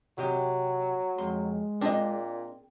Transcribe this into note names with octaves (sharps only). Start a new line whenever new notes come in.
C3 F#3 G4 D#5
F2 G#3 C6
A#2 C4 D4 G#4 D#5